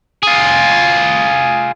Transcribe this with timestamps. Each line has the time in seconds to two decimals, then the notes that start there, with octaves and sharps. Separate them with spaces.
0.23 F4 G#4